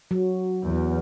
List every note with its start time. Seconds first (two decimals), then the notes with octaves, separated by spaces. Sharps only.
0.11 F#3
0.66 E2